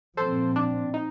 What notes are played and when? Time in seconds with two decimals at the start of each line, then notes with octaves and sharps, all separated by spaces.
0.17 A#2 F3 C4 A4 C5
0.56 D4
0.94 D#4